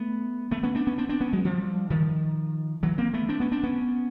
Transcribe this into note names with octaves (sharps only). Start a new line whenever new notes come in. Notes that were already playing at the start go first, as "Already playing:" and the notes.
Already playing: A3 B3
A3 B3
B3 C#4
C4 D4
B3 C#4
C4 D4
C4 D4
B3 C#4
F#3 G#3
F3 G3
D#3 F3
E3 F#3
A#3 C4
A3 B3
C4 D4
B3 C#4
C4 D4
B3 C#4